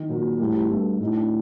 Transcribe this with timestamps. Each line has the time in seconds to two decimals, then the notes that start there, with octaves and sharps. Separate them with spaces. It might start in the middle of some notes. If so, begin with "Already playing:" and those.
Already playing: D#3
0.09 A#2 F#3
0.39 A2 G3
0.56 G3
0.70 G2 A3
1.00 A2 D#4
1.16 D4